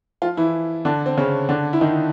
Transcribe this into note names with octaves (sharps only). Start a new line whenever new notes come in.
F3 F4
E3 E4
D3 D4
C4
C#3 C#4
D3 D4
E4
D#3 D#4